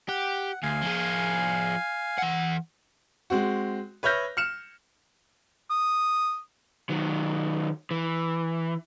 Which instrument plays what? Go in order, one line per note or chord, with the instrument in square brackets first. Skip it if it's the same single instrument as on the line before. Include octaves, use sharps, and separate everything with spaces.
[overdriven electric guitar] G4 [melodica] F#5
[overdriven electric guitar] D2 [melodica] F5 G#5
[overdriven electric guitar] F3 G#4
E3 F#5
[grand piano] G#3 C4 F#4
B4 C#5 E5 F6 G6 A#6
F6 C#7 E7
[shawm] D#6
[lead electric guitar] D#3 F#3
E3